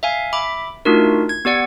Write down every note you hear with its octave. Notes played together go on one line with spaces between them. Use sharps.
E5 F5 G#5
E5 B5 D6
A3 D4 D#4 F4 F#4 A#4
G#6
B3 G4 D5 F#5